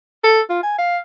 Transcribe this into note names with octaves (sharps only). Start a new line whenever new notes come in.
A4
F4
G#5
F5